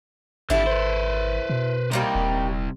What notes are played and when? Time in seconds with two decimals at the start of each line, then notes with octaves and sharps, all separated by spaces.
0.50 G#1 D3 G3 E4 A4
0.67 B4 C5
1.50 B2
1.91 C2 C3 G3 A#3 D#4
2.15 D#1